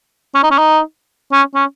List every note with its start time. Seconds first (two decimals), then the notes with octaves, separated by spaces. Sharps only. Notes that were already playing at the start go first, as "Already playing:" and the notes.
0.34 C#4
0.43 D#4
0.51 C#4
0.58 D#4
1.32 C#4
1.55 C#4